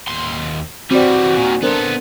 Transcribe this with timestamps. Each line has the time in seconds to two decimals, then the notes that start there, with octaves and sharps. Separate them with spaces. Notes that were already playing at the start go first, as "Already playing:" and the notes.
0.08 D#2 C6
0.91 E3 G3 C4 F#4 D5
1.37 A#2 D#3 G#5
1.63 B3 D4 A4 A#4 C5